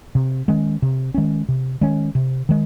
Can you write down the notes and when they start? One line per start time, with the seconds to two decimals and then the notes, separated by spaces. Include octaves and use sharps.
0.15 C3
0.48 D#3 G#3 C#4
0.82 C3
1.14 D#3 G#3 C#4
1.49 C3
1.81 D#3 G#3 C#4
2.15 C3
2.49 D#3 G#3